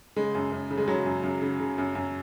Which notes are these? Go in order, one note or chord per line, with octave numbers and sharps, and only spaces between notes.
C#3 G#3
F#2
F#2
C#3
G#3
C#3 F#3
F#2
F#2
C#3
C#3
F#2
F#2